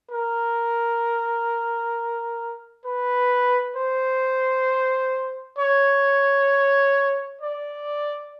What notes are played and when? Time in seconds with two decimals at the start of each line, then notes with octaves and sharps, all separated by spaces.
0.11 A#4
2.85 B4
3.76 C5
5.58 C#5
7.41 D5